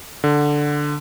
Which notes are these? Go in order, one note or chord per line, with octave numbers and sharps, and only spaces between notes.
D3